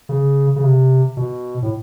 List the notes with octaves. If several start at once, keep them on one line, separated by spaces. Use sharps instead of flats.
C#3
C#3
C3
B2
A2